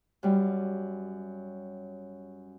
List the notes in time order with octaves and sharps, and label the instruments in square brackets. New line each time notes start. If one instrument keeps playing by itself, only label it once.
[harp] F#2 G3